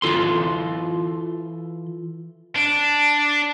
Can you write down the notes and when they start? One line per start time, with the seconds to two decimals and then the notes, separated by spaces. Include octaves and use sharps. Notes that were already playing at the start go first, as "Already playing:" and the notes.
0.02 E3 F4 A4 C6
2.56 D4